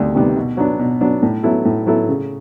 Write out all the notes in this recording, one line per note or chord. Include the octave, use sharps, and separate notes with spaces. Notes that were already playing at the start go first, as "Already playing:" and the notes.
Already playing: D2 C3 D#3 G3
C3 D#3 G3 B3
B2
F#3 B3 D4
B2
F#3 B3 D4
A2
F#3 B3 E4 A4
A2
F#3 B3 E4 A4
C#3